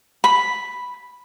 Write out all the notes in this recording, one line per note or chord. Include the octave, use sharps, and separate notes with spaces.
B5